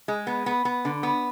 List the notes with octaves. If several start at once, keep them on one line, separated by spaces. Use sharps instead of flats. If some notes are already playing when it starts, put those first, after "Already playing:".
G#3
B3
B3
B3
D3
B3